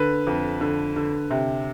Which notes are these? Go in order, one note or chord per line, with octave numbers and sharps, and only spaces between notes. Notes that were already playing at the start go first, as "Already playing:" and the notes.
Already playing: D3 B4
F2
D3
D3
C3